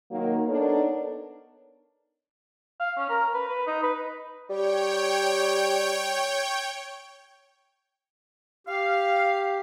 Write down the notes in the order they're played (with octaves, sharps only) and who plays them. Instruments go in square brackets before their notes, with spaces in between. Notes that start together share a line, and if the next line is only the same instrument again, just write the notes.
[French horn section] D#3 F#3 A#3
B3 D4 D#4 A4 A#4 C#5
[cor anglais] F5
C#4
A#4
B4
B4
D#4
B4
[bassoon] G3 [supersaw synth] C#5 G5
[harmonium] G4 [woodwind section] F5